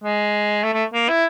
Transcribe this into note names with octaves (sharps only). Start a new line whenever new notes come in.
G#3
A3
A3
A#3
E4